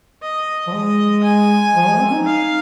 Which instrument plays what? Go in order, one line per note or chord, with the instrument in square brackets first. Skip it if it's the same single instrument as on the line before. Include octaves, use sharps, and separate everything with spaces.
[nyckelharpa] D#5
[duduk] F3
[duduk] G#3 [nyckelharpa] D#5
[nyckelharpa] G#5
[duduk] F3
G#3
C4
D#4
[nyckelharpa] F5